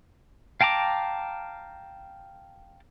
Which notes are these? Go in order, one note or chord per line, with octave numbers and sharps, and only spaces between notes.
F5 G5 A5 A#5 D6